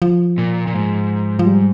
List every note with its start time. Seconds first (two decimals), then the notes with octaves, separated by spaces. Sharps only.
0.02 F3
0.38 A#2
0.67 A#2
0.74 G#2
1.39 F3
1.46 G3